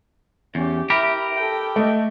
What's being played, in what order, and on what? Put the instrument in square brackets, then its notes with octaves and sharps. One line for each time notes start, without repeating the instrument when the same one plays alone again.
[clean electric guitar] E2 [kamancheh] C#4 G4
[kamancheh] E4 [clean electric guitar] G4 A#4 [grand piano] B5
[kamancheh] A4 G5
[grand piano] A3 D#5